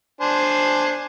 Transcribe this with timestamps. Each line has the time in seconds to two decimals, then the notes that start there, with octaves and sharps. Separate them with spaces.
0.21 D4 C5 G#5